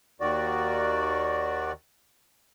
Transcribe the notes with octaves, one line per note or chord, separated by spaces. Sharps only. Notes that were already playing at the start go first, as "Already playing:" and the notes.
D#2 D#3 F#4 D5